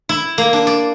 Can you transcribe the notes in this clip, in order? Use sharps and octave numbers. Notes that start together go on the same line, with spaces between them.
E4
A#3
D4
D5